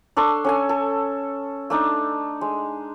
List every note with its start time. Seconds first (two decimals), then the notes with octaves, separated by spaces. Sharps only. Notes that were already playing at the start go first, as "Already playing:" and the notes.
0.16 D4 A4 C#5 C6
0.44 C#4 A4 G#5
0.69 A4
1.70 A3 D4 D#4
2.41 G#3